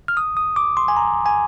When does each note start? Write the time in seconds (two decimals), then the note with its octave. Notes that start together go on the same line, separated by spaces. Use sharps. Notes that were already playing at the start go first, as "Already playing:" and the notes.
0.08 F6
0.17 D#6
0.37 D#6
0.56 D6
0.77 C6
0.88 G#5
0.97 A#5
1.26 G#5